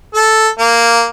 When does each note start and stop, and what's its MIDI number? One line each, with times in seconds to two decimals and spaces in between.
0.15 0.48 69
0.59 1.06 58